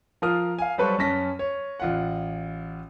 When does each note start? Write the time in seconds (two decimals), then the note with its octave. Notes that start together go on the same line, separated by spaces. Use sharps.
0.22 F3 F4 A#4 D#6 F6
0.58 F5 G#5
0.78 F#3 G3 A4 B4 C5 C#6
0.98 F#2 C#4 A5 A#6 B6
1.39 C#5
1.80 A1 F4 F#5